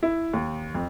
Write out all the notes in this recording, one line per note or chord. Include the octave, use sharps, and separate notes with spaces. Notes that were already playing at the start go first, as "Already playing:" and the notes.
E4
D#2
F2